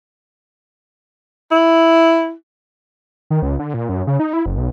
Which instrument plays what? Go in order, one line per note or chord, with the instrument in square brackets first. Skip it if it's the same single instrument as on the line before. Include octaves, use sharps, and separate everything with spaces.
[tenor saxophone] E4
[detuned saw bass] D#3
C#2
D3
A#2
F#2
C#3
D#4
E4
F#1
B1